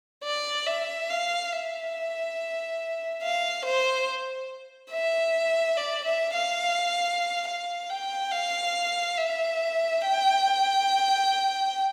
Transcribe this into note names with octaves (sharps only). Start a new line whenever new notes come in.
D5
E5
F5
E5
F5
C5
E5
D5
E5
F5
F5
G5
F5
E5
G5